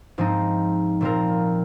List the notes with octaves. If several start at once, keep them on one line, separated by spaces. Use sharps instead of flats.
G#2 F3 C4 D#4
A#2 F3 C4 F4 A#4